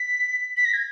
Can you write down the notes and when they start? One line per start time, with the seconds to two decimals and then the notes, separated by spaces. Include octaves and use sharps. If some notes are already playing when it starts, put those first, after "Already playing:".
Already playing: B6
0.57 B6
0.65 A#6
0.74 G#6